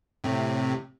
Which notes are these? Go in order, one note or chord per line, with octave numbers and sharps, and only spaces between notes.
A2 C3